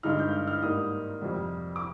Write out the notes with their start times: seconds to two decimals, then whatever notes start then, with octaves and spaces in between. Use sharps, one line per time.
0.03 G2 D3 G#3 D#4 F6
0.19 G6
0.33 F6
0.47 F6
0.62 G#2 G3 A#3 D#4 D#6
1.22 F2 C3 G3
1.76 D6